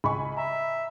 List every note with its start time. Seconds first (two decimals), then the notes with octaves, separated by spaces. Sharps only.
0.04 C#2 D#5 G#5 B5 C#6
0.37 E5 A#5